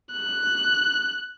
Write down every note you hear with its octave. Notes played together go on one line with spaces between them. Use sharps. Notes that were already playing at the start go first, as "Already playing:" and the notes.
F#6